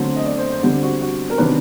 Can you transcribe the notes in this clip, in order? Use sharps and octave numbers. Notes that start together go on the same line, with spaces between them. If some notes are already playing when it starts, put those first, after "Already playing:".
Already playing: D3 F#3 A3 C4 C5
D#5
D5
C5
C5
D3 G3 C4 C5
F#4
F#4
A#4
C3 D#3 F#3 B3 D4 B4